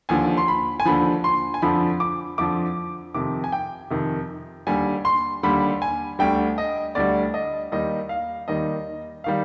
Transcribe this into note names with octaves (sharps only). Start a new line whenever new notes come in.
D#2 D3 F3 G#5
C6
B5
G#5
D#2 D3 F3 B5
C6
G#5
F2 D3 F3 B5
D6
F2 D3 F3 D6
F2 C3 D#3 D6
G#5
G5
F2 C3 D#3
D#2 D3 G3 G#5
C6
D#2 D3 G3 B5
G#5
D2 D3 G3 G5
D#5
D2 D3 G3 D5
D#5
D#2 D#3 G3 D#5
F5
D#2 D#3 G3 D#5
D#3 G3 F5